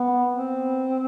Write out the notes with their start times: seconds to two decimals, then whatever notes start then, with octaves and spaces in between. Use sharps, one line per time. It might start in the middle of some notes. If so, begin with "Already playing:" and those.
Already playing: B3
0.34 C4